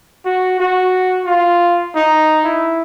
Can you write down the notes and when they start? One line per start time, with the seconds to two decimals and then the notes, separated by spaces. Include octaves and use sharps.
0.26 F#4
0.60 F#4
1.26 F4
1.95 D#4
2.45 E4